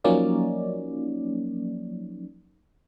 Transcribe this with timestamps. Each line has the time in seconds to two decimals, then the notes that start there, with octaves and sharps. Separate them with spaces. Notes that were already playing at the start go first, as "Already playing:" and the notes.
0.04 F3 F#3 A#3 C#4 D#4 D5